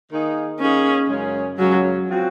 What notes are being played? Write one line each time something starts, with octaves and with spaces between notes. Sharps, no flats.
D#3 A#3 D#4 G#4
D#3 A#3 C#4 D#4 G#4
F#2 C#3 G#3 C#4
F#2 C#3 F#3 G#3 C#4
F3 C4 F#4